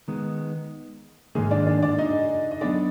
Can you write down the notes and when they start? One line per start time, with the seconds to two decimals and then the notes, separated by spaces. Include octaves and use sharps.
0.08 D#3 G#3 B3
1.35 G#2 D#3 G#3 A#3 D#4 G#4
1.51 D4 D5
1.66 D4 D5
1.82 D4 D5
1.98 D#4 D#5
2.51 D#5
2.61 F#3 B3 D4 D#4 D5